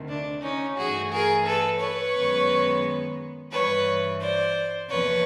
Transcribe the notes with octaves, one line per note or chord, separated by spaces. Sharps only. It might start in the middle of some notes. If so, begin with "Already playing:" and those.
Already playing: D2 C3 D#3
D4
C#4 D#4
G2 E3 A3 F#4 G#4
G#4 A#4
A4 B4
B4 C#5
F#2 D#3 G#3 B3
G2 E3 G3 B4 C#5
C5 D5
E2 C3 F3 A#3 B4 C#5